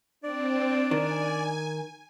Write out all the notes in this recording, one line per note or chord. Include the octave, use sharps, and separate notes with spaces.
C4 D4 D5
D#3 G#5